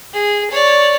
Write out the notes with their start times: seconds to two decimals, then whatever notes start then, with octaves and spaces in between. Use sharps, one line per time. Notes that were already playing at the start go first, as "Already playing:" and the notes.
0.13 G#4
0.51 C#5 D5